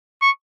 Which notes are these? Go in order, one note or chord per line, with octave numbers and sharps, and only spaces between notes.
C#6